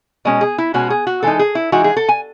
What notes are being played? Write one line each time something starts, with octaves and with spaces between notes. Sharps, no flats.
B2 G#3 C#4 D#5
G#4
E4
B2 G#3 C#4 F#4
G#4
F#4
E3 G#3 D#4 A4
G#4
E4
E3 G#3 D#4 F#4
G#4
A4
G#5